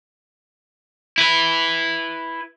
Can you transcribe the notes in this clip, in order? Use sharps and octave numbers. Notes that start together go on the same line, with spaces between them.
E4 B4